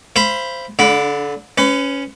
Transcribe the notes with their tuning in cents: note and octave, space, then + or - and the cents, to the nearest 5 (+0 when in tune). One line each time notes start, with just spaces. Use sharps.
C5 +0 F5 -40 B5 +0
D3 -25 D4 +15 B5 +0
C#4 +5 B4 +35